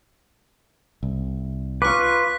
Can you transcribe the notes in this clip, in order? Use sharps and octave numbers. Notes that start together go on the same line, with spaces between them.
C2
F4 B4 C#6 D6 F#6 B6